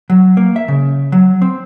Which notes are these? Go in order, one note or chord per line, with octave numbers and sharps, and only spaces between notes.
F#3
A#3
E5
C#3
F#3
C4